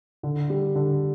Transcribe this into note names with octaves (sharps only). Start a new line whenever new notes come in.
D3
G3
D3